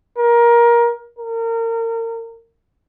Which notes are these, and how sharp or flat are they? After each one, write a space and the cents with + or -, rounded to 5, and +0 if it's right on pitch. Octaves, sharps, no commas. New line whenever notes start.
A#4 +20
A#4 -30